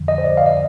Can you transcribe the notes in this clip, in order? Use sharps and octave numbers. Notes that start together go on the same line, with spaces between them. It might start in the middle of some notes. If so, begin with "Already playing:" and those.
Already playing: F2 D3 F3
D#5
C5
D5
F5
D#5